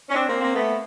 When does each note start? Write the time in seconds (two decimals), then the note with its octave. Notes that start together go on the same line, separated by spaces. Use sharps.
0.09 C#4
0.14 C4 D4
0.28 A#3 C4
0.40 A#3 C4
0.54 A3 B3